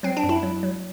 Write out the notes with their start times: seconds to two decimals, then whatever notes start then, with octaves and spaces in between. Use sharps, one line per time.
0.03 F#3 C4
0.17 D4
0.24 F#2
0.29 E4
0.43 F#3
0.63 F#3